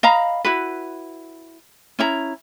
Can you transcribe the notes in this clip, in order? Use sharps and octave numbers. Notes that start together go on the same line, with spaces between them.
D#5 F5 A#5 B5
E4 F#4 B4
C#4 E4 A#5